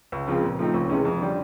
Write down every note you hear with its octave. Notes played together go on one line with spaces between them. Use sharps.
C#2
C#3 F3 G#3 C4
A#2
F3 A3 C4 D#4
C#2
C3 E3 G#3 C#4
F2
D3 G3